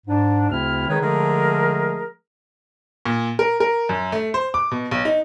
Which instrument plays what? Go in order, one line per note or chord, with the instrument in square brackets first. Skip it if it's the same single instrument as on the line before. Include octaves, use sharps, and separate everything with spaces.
[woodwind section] G#2 D4
D2 C#3 C4 E4 F6
D#3 G#3 D#4 G#4 B4 C#5
D3 F3 G#3 A3 G#4 A#4
[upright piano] A#2
A#4
A#4
F#2
A3
C5
D6
B2
B1
D#4